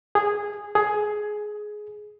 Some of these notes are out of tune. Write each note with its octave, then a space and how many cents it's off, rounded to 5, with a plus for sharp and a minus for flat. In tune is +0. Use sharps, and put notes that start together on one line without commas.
G#4 -10
G#4 +15